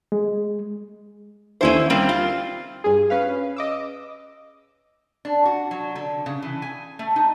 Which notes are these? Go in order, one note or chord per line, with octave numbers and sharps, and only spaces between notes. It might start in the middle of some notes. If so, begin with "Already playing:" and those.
G#3
D#2 D3 E3 C#4 E4 C5
G3 A#3 C4
F4
G2 G#4
C#4 B4 F5
D#5 D6 E6
D4
F#4
F#3
D3
C#3
E3
G#5
A3
D#4